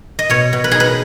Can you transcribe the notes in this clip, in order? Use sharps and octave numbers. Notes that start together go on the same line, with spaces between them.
D#5
B2 C#5
B2
B4
D#4 G#4
B4